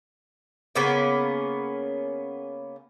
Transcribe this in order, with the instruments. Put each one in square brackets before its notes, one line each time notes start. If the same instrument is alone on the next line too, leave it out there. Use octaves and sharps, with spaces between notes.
[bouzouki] C#3 A#3 B3 C#4